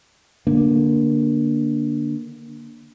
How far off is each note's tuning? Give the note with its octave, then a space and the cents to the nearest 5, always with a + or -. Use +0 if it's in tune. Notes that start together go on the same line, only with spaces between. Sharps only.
D3 +0 A#3 +15